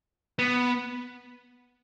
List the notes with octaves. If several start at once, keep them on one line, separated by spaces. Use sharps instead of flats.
B3